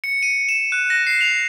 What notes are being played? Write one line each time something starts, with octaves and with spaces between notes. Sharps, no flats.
C#7
D#7
E7
F#6
A#6
C7
F7